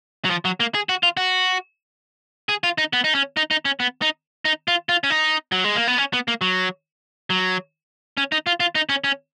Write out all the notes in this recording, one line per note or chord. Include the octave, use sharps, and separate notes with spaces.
F#3
F3
F#3
A#3
G#4
F#4
F4
F#4
G#4
F4
D#4
B3
D#4
C#4
D#4
D#4
C#4
B3
D#4
D#4
F4
F4
C#4
D#4
F#3
G#3
A#3
B3
C#4
B3
A#3
F#3
F#3
C#4
D#4
F4
F4
D#4
C#4
C#4